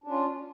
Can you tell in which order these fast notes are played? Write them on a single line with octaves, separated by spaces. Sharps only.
D4 C#4 F4